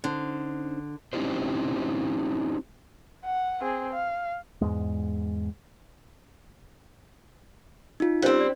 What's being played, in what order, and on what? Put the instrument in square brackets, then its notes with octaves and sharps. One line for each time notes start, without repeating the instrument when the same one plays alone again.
[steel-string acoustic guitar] D3 [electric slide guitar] C#4 D#4 C5
[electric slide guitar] C4 C#4 D#4 E4 G4 C5
[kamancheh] F#5
C4 G#4
F5
[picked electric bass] E2 G#2 G#3
[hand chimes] D#4 F4
[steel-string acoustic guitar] G3 C4 [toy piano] C#4 C5
[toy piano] D5